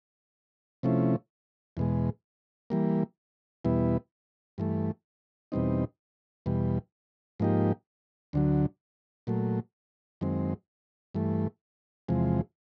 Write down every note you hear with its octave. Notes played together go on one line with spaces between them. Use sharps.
C3 F3 A3 C#4 E4
E2 B2 G#3
E3 G3 A#3
E2 B2 G3 B3 E4
G2 E3 A3
E2 B2 G3 C4 D#4
E2 B2 G3
G#2 F3 A#3 D#4 G4
D2 D3 F#3
A#2 F#3 A3
F#2 D#3 G#3 C4
G2 E3 A3
E2 C3 F3 G#3